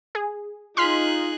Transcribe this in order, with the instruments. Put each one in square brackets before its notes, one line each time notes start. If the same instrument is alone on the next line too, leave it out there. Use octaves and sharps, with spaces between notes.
[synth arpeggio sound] G#4
[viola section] D#4 [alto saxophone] F4 [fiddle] G#4 F#6 [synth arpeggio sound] C6 F6 B6